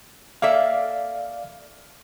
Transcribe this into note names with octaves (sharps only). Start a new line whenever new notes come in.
A#3 A4 D5 E5 F5